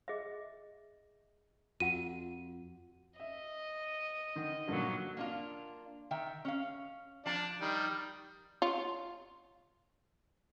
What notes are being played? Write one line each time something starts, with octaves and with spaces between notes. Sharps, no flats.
G#4 D#5 E5
F2 F4 F#4 F#5 D#7
D#5 E5
D3 D#3
G2 A#2 D3 F3 F#3
A#3 D4 F4
D#3 E5 G5
C#4 F5
F3 D4 D5 A5
D#3 G3
F4 C#5